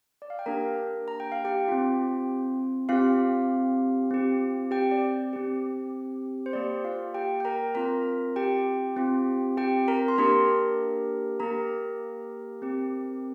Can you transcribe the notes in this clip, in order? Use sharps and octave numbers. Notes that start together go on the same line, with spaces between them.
D5
F5
G5
A#3 D4 G4 A#4 A#5
A#5
G5
F5
G4 G5
C4 F4
C4 F4 G4 F5
C4 G4
G4 G5
D5
C4 G4
C5
A#3 G4 D5
F4 F5
G4 G5
G5
A#4 A#5
C4 F4 A#4 A#5
G4 G5
C4 F4
G4 G5
A#4 A#5
C6
A#3 D4 G4 A#4 A#5
A#3 G4 A#4 A#5
C4 G4